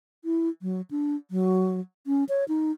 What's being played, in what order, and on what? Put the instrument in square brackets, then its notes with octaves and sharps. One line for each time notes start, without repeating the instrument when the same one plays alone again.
[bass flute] E4
F#3
D4
F#3
C#4
C#5
D#4